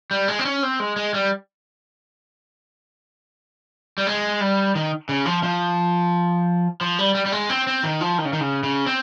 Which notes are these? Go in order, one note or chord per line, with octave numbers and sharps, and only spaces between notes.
G3
G#3
C4
C#4
C4
G#3
G#3
G3
G3
G#3
G3
D#3
C#3
F3
F3
F3
G3
G3
G3
G#3
C4
C4
D#3
F3
D#3
C#3
D#3
C#3
C#3
C4